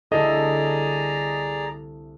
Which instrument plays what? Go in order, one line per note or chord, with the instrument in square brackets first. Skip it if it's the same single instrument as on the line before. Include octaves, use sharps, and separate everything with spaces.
[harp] C2 D3 [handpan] E4 A4 [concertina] G#4 D5 A#5 [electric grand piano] D#5